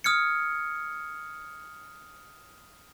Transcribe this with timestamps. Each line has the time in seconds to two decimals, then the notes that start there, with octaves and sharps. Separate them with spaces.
0.04 D#6 F6 G#6 C#7